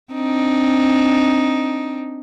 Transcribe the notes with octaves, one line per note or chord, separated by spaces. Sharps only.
C4 D4 D#4